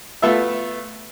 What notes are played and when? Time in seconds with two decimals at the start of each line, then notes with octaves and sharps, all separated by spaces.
0.22 A3 B3 F4 A4 E5